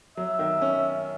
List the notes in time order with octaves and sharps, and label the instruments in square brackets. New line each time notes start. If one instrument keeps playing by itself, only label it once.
[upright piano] F#3 [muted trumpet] E5
[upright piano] D#3
C#4